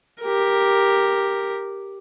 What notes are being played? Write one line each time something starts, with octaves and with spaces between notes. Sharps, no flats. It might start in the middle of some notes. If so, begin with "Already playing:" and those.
G4 A#4